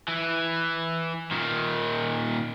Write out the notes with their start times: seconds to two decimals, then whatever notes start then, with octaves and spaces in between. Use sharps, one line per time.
0.08 E3
1.32 A#2 D#3